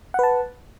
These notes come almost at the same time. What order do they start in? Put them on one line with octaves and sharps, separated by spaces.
F#5 B4 A5